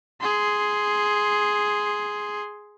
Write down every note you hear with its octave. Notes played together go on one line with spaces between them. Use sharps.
G#4 C6